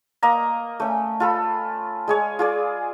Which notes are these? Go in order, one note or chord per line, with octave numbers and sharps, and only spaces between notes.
A#3 D#5 A#5
A3 C#4
F4 A4 B5
G#3 G#4 C#5
F4 G#4 D5